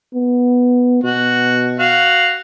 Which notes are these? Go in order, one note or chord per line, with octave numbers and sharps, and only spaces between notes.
B3
B2 F#4
F#4 F5